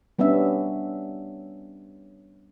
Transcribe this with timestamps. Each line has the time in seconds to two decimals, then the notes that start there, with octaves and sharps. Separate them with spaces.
0.19 G3 B3 C#4 D4 E5